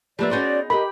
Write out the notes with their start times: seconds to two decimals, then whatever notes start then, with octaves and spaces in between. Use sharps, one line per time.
0.19 F3 G3 A#3 B3 D4 D5 E5
0.31 B3 C#4 D#4 F#4 G#4 C5
0.70 G4 A#4 D#5 B5